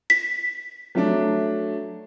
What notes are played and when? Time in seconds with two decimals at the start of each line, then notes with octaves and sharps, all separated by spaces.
0.10 B6
0.95 F#3 A3 D4